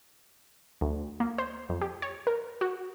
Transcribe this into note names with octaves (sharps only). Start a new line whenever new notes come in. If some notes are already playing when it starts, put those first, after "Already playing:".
D2
A#3
C5
F2
G4
C#5
A#4
F#4